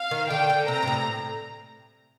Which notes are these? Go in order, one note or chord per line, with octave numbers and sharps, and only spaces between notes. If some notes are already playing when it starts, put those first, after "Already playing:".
Already playing: F5
D#3
D3 G5
D3
C3 A#5
G2
A2